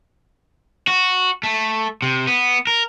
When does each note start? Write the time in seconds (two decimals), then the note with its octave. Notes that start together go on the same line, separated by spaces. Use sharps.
0.88 F#4
1.43 A3
2.02 C3
2.27 B3
2.67 A#4